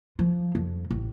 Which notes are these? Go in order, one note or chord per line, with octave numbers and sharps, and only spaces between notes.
F3
F2
A1